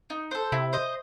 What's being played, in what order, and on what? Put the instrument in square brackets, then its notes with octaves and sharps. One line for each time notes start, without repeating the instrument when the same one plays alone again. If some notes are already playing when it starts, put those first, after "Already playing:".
[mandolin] D#4
A4 C5
[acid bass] C3 [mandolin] E4
[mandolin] C5 D#5